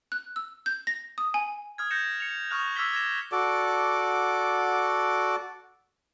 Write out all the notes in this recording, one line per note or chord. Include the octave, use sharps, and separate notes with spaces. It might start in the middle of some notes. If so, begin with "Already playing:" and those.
F#6
E6
G6
A#6
D#6
G#5
D#6 F6 G#6
G6 A#6 C#7 E7
C#7 F7
C#6 D#6 F6 F#6 F7
D6 E6 F6 G#6 B6 G7
G#6 A#6 E7
F#4 A4 D5 D6